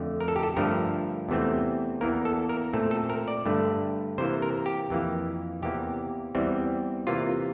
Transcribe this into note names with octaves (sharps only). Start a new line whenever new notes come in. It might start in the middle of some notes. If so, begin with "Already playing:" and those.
Already playing: F2 D3 A3
A#4
A4
G4
A4
G2 D3 F3 A3 A#4
E2 C3 E3 A3 C4
E2 E3 A#3 A#4
A4
A#4
A#2 A3 C4 A4
A4
A#4
D5
G2 D3 A3
C3 E3 A#3 C5
A#4
G4
F2 E3 A#3
E2 C3 E3 A#3 G4
E2 E3 G3 C4
C3 E3 A#3 F4